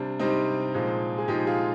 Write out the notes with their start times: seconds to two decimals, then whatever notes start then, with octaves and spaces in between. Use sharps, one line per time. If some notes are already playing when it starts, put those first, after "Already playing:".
Already playing: C3 G3 D4
0.19 C3 G3 C4 D#4
0.74 A#2 F3 G#3
1.18 G#4
1.28 A#2 F3 G#3 D#4 G4
1.47 F4 G#4